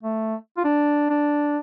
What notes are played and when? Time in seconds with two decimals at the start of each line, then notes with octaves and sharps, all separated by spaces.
0.03 A3
0.57 F4
0.64 D4
1.10 D4